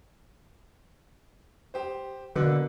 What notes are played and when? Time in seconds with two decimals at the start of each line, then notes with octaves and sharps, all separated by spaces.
1.74 G4 C5
2.36 B2 D3 A#3 F#6